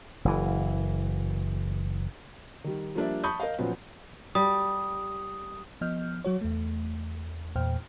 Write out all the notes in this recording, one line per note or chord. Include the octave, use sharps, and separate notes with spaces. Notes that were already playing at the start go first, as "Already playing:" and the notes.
F#1 E3
D#3 G3
F3 G3 A#3 D4 D5 E5
A5 B5 C#6 D#6 G6
A#4 D#5 F5
A#2 F3 F#3 B3 C#4
G3 D#6
F3 B3 D#5 F6 G6
F#3 F#4 C#5
E2 A3
E2 A#2 C5 G5 F6